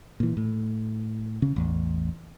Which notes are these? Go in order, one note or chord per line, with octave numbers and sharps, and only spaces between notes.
A#2 E3
A2
C#3 C#4
A1 E2